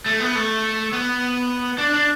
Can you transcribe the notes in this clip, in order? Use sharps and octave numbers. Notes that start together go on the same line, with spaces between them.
A3
B3
A3
B3
D4
D4